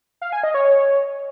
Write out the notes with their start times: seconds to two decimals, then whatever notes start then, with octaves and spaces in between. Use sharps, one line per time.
0.22 F5
0.32 G#5
0.43 D#5
0.54 C#5